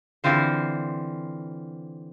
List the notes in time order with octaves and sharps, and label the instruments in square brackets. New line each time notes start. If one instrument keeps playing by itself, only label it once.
[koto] D3 E3 C4 F4 C5